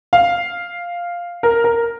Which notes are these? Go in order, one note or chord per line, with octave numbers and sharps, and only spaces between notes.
F5
A#4
A#4